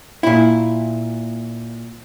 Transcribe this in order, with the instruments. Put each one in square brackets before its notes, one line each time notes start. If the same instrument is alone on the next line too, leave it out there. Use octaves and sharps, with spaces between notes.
[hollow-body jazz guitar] A#2 E4